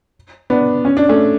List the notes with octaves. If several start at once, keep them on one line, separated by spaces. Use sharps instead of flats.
B3 D4
C#4
D4
A3 C#4